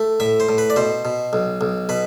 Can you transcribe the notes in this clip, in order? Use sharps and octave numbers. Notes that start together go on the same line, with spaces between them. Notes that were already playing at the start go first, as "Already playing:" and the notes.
Already playing: A3
A2 E5
C5
A2
B4
D5
B2 C5
B2
B1
B1
B2 B4